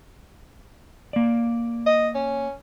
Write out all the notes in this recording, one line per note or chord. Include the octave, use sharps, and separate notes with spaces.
A#3 D5
D#5
C#4